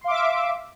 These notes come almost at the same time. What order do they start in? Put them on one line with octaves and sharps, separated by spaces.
C6 F5 D6 E5